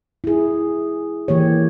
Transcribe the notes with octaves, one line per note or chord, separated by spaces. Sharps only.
E4 G#4
E3 A#3 G4 C#5